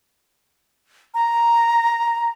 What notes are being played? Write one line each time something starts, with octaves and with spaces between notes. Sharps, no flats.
A#5